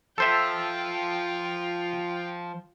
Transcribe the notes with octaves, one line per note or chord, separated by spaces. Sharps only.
F3 F4 A4 C5 E5 G5